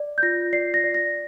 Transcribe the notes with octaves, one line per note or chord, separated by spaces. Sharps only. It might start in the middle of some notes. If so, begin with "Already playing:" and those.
Already playing: D5
G6
F4 A#6
D5 C7
A#6
D5
A#6